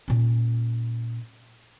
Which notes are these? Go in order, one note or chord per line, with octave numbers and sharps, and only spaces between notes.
A#2 C#4